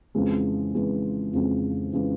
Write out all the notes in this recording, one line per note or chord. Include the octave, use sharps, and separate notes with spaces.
F2 C#3 E3 G#3
F2 C#3 E3 G#3
F2 C#3 E3 G#3
C#3 E3 G#3